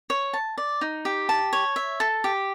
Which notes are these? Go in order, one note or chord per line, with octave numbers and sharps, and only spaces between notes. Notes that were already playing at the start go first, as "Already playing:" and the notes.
C#5
A5
D5
D#4
G4
A5
C#5
E5
A4
G4